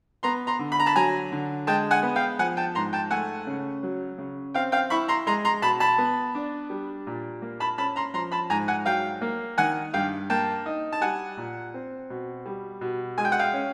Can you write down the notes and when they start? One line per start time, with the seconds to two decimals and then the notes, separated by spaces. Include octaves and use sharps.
0.23 B3 A#5 C6
0.47 A#5 C6
0.59 D3
0.72 B5
0.80 A#5
0.86 A5 B5
0.95 F#3 G#5 A#5
1.32 D3
1.67 G#3 G5 A5
1.91 F#5 G#5
2.03 B3
2.16 F5 G5
2.39 F3 F#5 G#5
2.57 G5 A5
2.75 G#2 A#5 C6
2.93 G5 A5
3.11 A3 F#5 G#5
3.47 C#3
3.83 F#3
4.18 C#3
4.54 C4 F5 G5
4.72 F5 G5
4.90 E4 B5 C#6
5.08 A#5 C6
5.27 G#3 A#5 C6
5.45 A#5 C6
5.62 B2 A5 B5
5.80 A5 B5
5.98 B3
6.35 D4
6.70 G3
7.07 A#2
7.42 A#3
7.60 A5 B5
7.78 C#4 A5 B5
7.96 A#5 C6
8.14 F3 A#5 C6
8.32 A5 B5
8.50 G#2 G#5 A#5
8.68 F#5 G#5
8.86 F#3 F5 G5
9.21 A#3
9.58 D#3 F#5 G#5
9.94 G2 F5 G5
10.30 A#3 G5 A5
10.66 D#4
10.92 A5
11.01 G3 F#5 G#5
11.37 A#2
11.74 C4
12.10 B2
12.46 G3
12.81 B2
13.18 G#3 G#5
13.25 G5
13.32 F#5
13.39 F5 G5
13.53 C#4